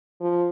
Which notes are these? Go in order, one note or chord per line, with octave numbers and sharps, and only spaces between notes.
F3